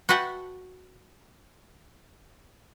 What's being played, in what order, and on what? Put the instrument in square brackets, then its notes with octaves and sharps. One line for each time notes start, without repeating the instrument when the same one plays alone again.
[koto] F#4 B4 E5 F#5 G5 A5